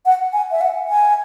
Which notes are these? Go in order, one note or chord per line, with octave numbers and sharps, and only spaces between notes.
F#5
G#5
E5
F#5
G#5